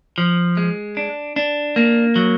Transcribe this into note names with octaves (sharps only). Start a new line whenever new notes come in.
F3
G#3
D4
D4
A#3
F#3